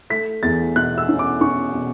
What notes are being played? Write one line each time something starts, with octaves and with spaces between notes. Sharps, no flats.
A3 B6
E2 A6
B2 F#6
E6
C#4
D6
C#4 C#6
B2